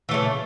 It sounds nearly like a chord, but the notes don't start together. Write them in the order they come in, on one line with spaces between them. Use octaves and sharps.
E3 A3 C#3